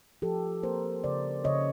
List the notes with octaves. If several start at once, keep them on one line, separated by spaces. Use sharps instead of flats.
F3 G4 A4
A#3 A#4 C5
C#3 C5 D5
C#3 C#5 D#5